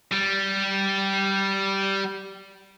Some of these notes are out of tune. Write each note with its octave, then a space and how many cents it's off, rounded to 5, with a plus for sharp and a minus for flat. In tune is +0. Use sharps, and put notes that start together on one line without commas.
G3 -10